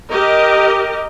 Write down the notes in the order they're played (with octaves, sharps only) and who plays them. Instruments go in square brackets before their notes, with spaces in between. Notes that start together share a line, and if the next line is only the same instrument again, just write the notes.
[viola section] G4 A#4 D#5